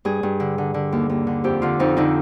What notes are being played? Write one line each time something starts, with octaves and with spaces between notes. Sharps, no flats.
G2 G#4
G2
D3
D3
D3
D#2
D#2
D3
F2 G4
D3 F4
F2 D#4
D3 D#4